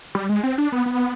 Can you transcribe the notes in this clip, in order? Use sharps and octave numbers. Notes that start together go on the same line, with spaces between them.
G3
G#3
C4
D4
B3
B3